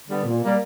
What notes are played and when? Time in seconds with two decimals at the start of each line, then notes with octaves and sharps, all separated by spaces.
0.09 D3 G3 B3
0.25 A#2
0.42 G3 A#3